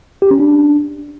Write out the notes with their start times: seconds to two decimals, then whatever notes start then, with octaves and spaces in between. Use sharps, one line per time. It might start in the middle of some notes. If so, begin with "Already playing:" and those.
0.22 G4
0.31 C#4
0.40 D4